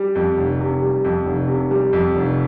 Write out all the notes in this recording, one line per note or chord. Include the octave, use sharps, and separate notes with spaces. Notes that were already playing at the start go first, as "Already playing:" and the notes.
Already playing: G3
F2
F1
C3
G3
F2
F1
C3
G3
F2
F1